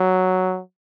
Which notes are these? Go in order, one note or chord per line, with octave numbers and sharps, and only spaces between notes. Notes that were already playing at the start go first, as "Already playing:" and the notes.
Already playing: F#3